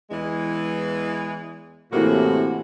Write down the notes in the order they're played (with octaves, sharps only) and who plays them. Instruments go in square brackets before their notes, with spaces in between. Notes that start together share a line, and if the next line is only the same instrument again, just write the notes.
[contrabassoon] E2 [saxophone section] E3 G#3
[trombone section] A2 [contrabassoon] C3 [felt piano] E3 A#3 [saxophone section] F#4